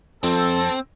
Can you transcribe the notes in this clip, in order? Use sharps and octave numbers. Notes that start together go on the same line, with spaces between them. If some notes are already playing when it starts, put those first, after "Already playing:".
F2 C4 A4